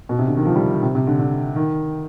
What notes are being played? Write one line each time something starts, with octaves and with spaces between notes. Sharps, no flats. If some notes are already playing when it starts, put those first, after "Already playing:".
B2
C3
D3
D#3
F3
G3
D#3
C3
C3
D3
D3
D#3